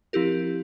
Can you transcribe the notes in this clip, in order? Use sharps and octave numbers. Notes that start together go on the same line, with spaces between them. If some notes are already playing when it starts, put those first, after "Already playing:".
F3 C4 E4 G4 A#4